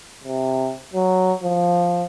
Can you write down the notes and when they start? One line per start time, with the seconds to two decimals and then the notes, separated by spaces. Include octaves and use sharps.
0.24 C3
0.93 F#3
1.43 F3